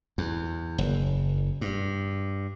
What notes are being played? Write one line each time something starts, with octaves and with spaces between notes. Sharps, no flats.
E2
F#1
G2